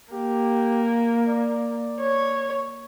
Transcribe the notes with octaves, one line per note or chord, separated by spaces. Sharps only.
A#3 G4
D5
C#5